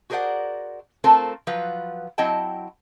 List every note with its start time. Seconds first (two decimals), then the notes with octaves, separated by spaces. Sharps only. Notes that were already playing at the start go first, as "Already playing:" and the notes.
0.10 F#4 G#4 A#4 C5 D5 F#5
1.04 A3 C4 F4 A4 A#4 C5
1.47 F3 F#3 F4 B4
2.18 F#3 C4 E4 D#5 G5 A5